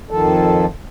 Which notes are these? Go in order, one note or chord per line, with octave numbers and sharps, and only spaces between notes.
F2 D#3 F3 A4